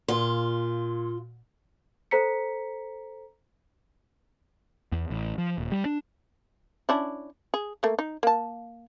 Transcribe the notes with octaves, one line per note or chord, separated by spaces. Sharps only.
A#2 F4
A4 C5 A#5 B6 C#7
E2
A1
F3
D#1
G3
D4
C#4 D4 E4
G#4
A3 A#3
D#4
A#3 A5